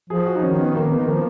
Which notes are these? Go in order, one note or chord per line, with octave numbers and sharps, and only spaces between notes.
F3 G#4
F#4
D#4
D#3 C#4
B3
A#3
B3
D#3
F3 A#3